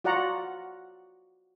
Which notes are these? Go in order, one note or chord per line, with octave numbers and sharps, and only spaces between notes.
F4 F#4 D5 F#5 A#5